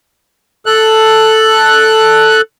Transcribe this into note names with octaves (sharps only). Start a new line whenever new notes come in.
A4 F#6